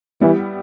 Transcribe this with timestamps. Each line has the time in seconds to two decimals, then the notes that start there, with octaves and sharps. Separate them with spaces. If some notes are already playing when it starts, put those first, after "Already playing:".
0.21 E3 G3 B3 E4 G4